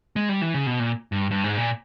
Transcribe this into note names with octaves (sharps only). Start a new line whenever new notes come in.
G#3
G3
E3
C#3
B2
A#2
G2
G2
G#2
A#2